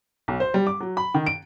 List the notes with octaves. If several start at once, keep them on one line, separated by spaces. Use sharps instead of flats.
B1
C5
G3
D6
F#3
B5
D#3
D7